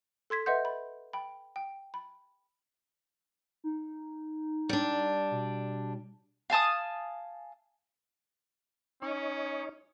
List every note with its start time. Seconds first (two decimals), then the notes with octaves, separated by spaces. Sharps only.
0.30 A4 C6 G#6 B6
0.46 B4 D#5 E5 F#5 C6 G6
0.65 B5
1.13 G5 B5
1.56 G5
1.94 B5
3.64 D#4
4.69 G3 D4
5.31 B2
6.50 F5 G#5 A5 D#6
9.02 C#4 D#4 C#5